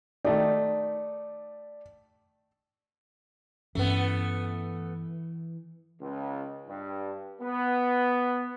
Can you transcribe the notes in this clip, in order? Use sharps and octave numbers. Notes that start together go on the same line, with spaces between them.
D#3 A3 D#4 D5
G2 E3 A3 B3 C#4
C#2
G2
B3